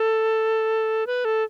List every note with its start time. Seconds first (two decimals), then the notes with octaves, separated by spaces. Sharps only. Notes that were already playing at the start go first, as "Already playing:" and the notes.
Already playing: A4
1.07 B4
1.25 A4